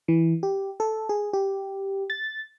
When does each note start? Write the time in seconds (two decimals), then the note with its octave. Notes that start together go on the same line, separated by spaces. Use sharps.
0.08 E3
0.43 G4
0.80 A4
1.09 G#4
1.33 G4
2.10 A6